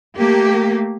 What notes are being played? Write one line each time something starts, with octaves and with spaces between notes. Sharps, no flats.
A3 A#3 G4